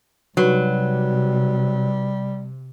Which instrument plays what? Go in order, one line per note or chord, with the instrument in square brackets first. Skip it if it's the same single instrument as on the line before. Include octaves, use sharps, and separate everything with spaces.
[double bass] C3 [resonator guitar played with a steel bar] F#3 [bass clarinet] G3 [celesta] D#4 F#4 B4